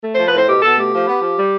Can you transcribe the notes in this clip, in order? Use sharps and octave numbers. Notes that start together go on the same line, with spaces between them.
A3
F3 C5
B4
A2 C5
B2 G4
B2 A4
A3 G4
F3
B3
F3
G3